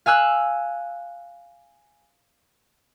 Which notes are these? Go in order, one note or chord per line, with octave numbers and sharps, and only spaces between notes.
F5 G#5 E6 F#6